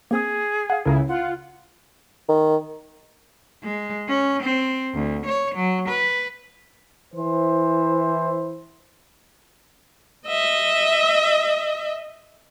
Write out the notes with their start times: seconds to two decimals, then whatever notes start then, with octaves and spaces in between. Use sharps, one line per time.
0.11 A#3 C4 G#4 D#6
0.70 F5 F#5
0.86 C#2 C#3 E4 A4 A#4 A#5
1.08 F4 F#5
2.29 D#3
3.64 G#3
4.08 C#4
4.42 C4
4.95 D2
5.26 C#5
5.55 F#3
5.89 B4
7.15 E3 E4 C5
10.27 D#5 E5